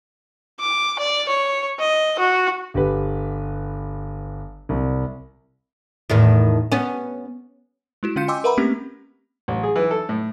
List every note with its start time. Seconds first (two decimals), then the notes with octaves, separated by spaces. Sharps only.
0.60 D6
0.99 D5
1.29 C#5
1.80 D#5
2.20 F#4
2.74 G1 G4 B4
4.69 C2
6.09 E2 A2 D#3
6.72 B3 C#4
8.03 G#3 E4 F#4
8.16 D3 C#4 F4 F5 G6 C#7
8.28 D#5 G5 G#5 C6 D6 E6
8.44 A#4 B4 E5 F#5 A#5 B5
8.57 A3 A#3 C4 C#4 G4
9.48 A1
9.63 G#4
9.76 E3
9.91 A4
10.09 A2